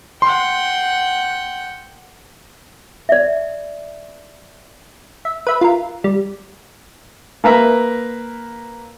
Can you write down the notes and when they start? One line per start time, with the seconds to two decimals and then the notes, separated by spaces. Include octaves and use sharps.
0.22 F#5 G5 C6
3.09 D5 E5
5.25 E5
5.47 B4 E5
5.61 F4 A#4
6.04 G3
7.44 A#3 A#4 B4 E5